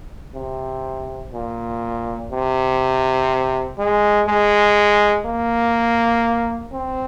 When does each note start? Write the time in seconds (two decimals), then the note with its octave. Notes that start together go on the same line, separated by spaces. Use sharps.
0.35 C3
1.33 A#2
2.32 C3
3.78 G#3
4.28 G#3
5.26 A#3
6.73 C4